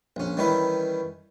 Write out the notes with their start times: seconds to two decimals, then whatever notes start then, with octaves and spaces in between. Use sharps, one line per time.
0.16 A#1 C#4
0.37 D#3 E3 G3 C#4 E4 B4